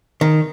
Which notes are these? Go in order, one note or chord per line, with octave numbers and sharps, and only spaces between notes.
D#3